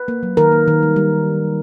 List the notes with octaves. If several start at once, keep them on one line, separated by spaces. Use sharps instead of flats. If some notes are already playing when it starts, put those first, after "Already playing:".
Already playing: B4
A#3
F#3
D#3 A#4
A#3
D#3
G3
G3